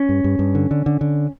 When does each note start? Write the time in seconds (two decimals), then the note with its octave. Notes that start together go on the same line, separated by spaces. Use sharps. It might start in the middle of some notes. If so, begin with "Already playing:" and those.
Already playing: C#4
0.09 G2
0.24 G2
0.39 G2
0.55 D3
0.71 D3
0.86 D3
1.01 D3